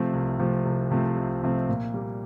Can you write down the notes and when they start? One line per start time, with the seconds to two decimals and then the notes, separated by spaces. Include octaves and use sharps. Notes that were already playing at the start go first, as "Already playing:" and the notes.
Already playing: C3 F3 A3 C4
0.13 C2
0.39 C3 F3 A3 C4
0.65 C2
0.91 C3 F3 A3 C4
1.16 C2
1.43 C3 F3 A3 C4
1.69 A#2
1.94 G3 A#3